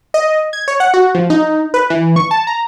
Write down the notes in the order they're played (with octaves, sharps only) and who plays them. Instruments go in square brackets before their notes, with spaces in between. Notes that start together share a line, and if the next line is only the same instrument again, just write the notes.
[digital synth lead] D#5
G#6
C#5
F#5
F#4
F3
D#4
B4
E3
C#6
A5
A#5